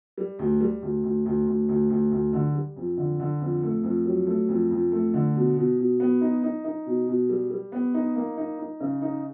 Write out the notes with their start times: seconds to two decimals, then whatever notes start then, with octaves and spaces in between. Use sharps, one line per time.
0.18 G3
0.39 D2
0.61 G3
0.82 D2
1.04 D2
1.26 D2
1.47 D2
1.69 D2
1.90 D2
2.12 D2
2.33 D3
2.55 G3
2.76 F2
2.97 D3
3.20 D3
3.41 F2
3.63 A3
3.84 F2
4.06 F#3
4.27 A3
4.49 F2
4.71 F2
4.92 A3
5.14 D3
5.35 B2
5.57 B2
5.78 B2
6.00 B3
6.21 D#4
6.43 D#4
6.64 D#4
6.86 B2
7.08 B2
7.29 G3
7.51 G3
7.72 B3
7.94 D#4
8.16 A#3
8.37 D#4
8.59 D#4
8.80 C#3
9.02 D#4